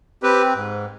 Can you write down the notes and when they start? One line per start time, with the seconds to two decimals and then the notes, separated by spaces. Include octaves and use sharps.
0.23 C4 G4 B4
0.55 G#2